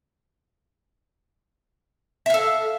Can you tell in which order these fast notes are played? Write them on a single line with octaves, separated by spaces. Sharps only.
E5 F5 A4